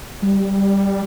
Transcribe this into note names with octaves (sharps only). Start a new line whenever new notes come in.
G3